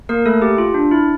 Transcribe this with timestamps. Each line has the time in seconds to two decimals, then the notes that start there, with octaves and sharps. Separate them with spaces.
0.09 A#3 A#4
0.26 A3 A4
0.42 G4
0.58 F4
0.74 D4
0.91 E4